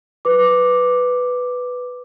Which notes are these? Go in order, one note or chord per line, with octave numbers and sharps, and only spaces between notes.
B4 D6